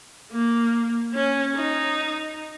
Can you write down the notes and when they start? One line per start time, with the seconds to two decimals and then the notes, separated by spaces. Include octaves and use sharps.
0.32 A#3
1.14 C#4
1.55 D#4